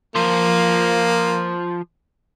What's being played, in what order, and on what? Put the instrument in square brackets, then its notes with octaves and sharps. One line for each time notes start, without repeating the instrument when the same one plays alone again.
[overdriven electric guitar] F3 C5 [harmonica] A#3